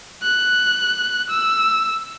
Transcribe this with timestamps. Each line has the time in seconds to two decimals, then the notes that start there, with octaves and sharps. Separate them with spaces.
0.23 F#6
1.30 E6